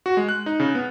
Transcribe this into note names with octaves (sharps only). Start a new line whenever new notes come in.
F#4
G#3
F#6
D#4
C#3
B3